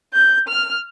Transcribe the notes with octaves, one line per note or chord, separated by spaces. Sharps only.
G6
F6